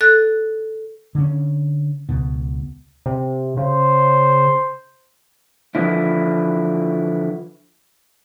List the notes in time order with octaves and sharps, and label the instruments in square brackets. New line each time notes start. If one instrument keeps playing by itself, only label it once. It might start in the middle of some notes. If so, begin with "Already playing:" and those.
[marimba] A4 F#6
[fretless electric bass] D3 C#4
C#2 B2
[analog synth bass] C3
[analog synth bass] C#3 [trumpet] C5
[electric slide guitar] D3 E3 F3 E4